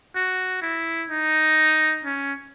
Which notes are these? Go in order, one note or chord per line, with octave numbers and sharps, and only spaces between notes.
F#4
E4
D#4
C#4